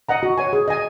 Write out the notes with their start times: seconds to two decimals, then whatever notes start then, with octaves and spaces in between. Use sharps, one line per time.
0.09 D#5 F#5 A#5
0.23 F#4
0.38 C#5 G#5
0.53 G#4
0.68 D#5 G#5